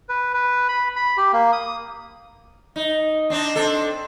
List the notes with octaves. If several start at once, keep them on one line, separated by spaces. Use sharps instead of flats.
B4
B4
B5
B5
G4
A#3
D#6
D#4
C4 D4 D#4
C4 D4 A4